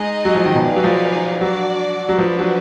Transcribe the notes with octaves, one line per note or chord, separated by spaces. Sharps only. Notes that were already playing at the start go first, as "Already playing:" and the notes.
Already playing: G#3 D#4 G#4 D#5
F#3
F3
D#3
B2
D#4 G#4 B4 D5 F5
F#3
F3
F#3 D4 F#4 D5
F#3
F3 D4 F#4 B4
F#3